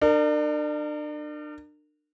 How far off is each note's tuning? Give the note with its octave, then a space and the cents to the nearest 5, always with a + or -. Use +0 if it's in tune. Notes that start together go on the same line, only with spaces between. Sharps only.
D4 +35 A#4 -30